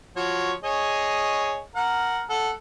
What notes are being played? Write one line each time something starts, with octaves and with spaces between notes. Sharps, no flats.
F3 F#4 C#5
G#4 C#5 D#5
A#4 F#5
A4 F#5